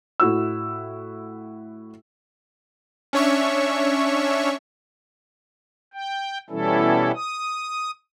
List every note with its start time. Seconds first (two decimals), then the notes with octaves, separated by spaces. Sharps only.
0.20 A2 E4 F#4 E6
3.13 C#4 D4 C#5 E5 C#6
5.94 G5
6.50 B2 E3 G3 C#4 E4 A4
7.15 D#6